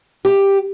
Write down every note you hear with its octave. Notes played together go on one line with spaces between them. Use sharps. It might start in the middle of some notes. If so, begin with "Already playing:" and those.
G4